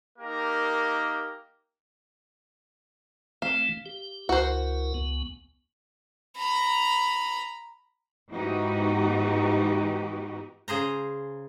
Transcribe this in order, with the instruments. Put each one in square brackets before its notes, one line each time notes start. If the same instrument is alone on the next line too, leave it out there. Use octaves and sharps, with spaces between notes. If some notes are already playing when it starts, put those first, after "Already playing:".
[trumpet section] A#3 D#4 G4 A#4
[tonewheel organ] E3 A3 C4 [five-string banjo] F5
[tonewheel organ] G4
[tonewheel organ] C#2 E4 A#4 [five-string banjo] F#4 C5
[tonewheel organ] C#2 B3
[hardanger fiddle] A#5 B5
[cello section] G#2 E3 B3 D#4 F#4 G4
[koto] C#3 G#4 C5 A#5